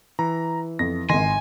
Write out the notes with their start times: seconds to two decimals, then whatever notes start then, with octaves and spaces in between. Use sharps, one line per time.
0.19 E3 A#5
0.79 F2 A#6
1.09 G#1 D#3 G#5 C6 A#6